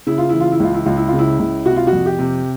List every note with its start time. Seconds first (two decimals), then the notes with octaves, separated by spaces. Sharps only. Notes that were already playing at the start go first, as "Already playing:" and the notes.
0.07 C#3 E4
0.18 F4
0.29 E3 E4
0.40 F4
0.52 E4
0.60 C#2 F4
0.74 E4
0.85 C#2 F4
0.97 E4
1.08 F4
1.13 C#3
1.19 E4
1.39 C#2
1.66 C3 F#4
1.76 F4
1.87 F#4
1.92 F2
2.06 G4
2.19 C3